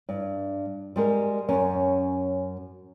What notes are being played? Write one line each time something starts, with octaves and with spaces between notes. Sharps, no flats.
G2
G3 G#3 A#4
F#2 C#4